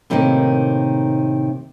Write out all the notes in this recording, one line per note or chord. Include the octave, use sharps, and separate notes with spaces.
A2 C3 D#3 A#3 D#4